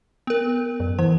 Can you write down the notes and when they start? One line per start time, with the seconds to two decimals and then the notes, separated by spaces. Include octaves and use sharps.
0.27 B3 A#4
0.80 F#2
0.99 E3 C5